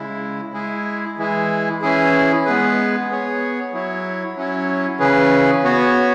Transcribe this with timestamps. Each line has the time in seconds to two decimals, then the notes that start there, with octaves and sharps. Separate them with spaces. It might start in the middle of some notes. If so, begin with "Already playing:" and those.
Already playing: C#3 G#3 E4
0.54 G#3 E4 G#4
1.18 E3 G#3 E4 G#4
1.81 E3 C#4 E4 G#4
2.45 G#3 B3 G#4 B4
3.09 B3 G#4 C#5
3.73 F#3 E4 C#5
4.36 F#3 C#4 E4 C#5
4.99 C#3 E3 C#4 G#4 B4
5.64 B3 F#4 C#5